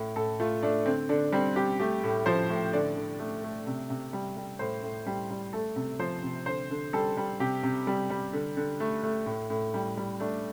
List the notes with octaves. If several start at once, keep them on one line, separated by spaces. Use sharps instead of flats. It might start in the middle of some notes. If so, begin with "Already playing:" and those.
Already playing: A2
A2 A4
A3 F4
A3 D4
D3 C4
D3 D4
G3 C4
G3 G4
A3 G4
A2
F3 C5
A2
D3 D5
D3
A3
A3
C3
C3
G3
G3
A2 C5
A2
G3
G3
A3 A4
C3
F3 C5
C3
D3 C5
D3
G3 A4
G3
C3 G4
C3
G3
G3
D3
D3
A3
A3
A2
A2
G3
G3
A3 D4